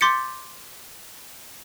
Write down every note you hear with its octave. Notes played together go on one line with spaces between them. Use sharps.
C6 D6 G6 A6 B6 C#7